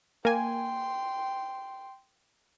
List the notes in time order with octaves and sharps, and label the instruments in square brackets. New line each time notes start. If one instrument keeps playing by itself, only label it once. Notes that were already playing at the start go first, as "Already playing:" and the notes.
[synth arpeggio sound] A#3 G#5 [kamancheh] G5 C6